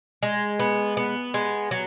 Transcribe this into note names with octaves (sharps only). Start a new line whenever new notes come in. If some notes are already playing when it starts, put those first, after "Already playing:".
G#3
B3
B3
G#3
F#3